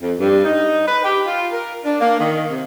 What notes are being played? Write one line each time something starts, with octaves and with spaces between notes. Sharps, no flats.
F2
G2
D#4
B4
G4
F4
A#4
D4
A#3
D#3
C3